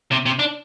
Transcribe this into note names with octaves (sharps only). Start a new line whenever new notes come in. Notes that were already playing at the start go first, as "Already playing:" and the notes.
C3
C3
D4